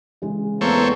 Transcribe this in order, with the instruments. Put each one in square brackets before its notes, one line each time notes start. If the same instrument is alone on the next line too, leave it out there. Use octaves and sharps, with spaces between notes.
[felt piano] C#3 E3 G#3
[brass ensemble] E2 [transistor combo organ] A3 C4 C#5 [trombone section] A#3